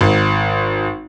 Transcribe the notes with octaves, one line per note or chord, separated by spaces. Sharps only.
G#1